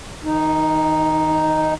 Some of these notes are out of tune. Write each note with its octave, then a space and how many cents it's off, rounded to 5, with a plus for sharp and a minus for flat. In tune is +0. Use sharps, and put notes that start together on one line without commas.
D#3 +35 D#4 +0